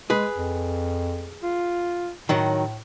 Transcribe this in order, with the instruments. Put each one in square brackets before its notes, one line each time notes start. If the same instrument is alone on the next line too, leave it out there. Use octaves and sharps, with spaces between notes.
[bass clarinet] G#3 [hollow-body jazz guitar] G#4 B4
[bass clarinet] F2
F4
[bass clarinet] A2 [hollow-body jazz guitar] D#3 F#3